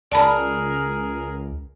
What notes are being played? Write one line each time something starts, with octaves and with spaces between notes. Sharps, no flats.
C#2 G#4 A#4 D5 A5 B5